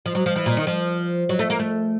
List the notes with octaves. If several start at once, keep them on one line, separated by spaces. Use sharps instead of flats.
F3
F#3
F3
E3
A#2
D#3
F3
F#3
A3
A#3
A3